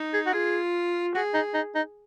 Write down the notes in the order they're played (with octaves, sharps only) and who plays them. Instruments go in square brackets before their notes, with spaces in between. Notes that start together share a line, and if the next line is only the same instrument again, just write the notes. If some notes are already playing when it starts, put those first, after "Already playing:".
Already playing: [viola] D#4
[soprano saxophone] G#4
F#4
[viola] F4 [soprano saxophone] G#4
[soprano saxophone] F#4 [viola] G#4
[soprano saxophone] D#4
D#4
D#4